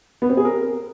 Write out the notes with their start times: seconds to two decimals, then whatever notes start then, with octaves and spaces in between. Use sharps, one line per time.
0.22 B3
0.30 C4
0.37 G#4
0.45 A#4